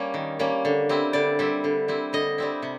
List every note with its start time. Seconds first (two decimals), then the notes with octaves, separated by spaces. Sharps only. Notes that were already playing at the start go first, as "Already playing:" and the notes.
Already playing: G3 A#3 C#4
0.14 D#3
0.39 G3 A#3 C#4
0.65 D3
0.89 G3 C4 E4
1.13 D3 D5
1.39 G3 C4 E4
1.64 D3
1.88 G3 C4 E4
2.13 D3 D#5
2.38 G3 C4 E4
2.62 C3